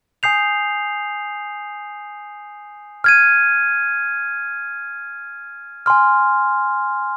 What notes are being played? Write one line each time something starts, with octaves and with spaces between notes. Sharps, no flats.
G#5 D#6 G6 C7 F7
F6 G#6 D#7
G#5 C6 F6